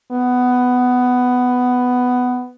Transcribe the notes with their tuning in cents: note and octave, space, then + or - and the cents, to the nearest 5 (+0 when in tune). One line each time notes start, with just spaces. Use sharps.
B3 +10